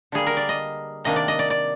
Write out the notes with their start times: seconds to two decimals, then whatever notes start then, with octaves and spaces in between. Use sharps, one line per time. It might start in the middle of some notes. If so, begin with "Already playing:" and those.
0.12 D3 G3 A#3 G#4
0.27 A#4
0.37 D5
0.49 D#5
1.04 C3 D#3 A#3 D4 D#5
1.16 D5
1.28 D#5
1.39 D5
1.50 D5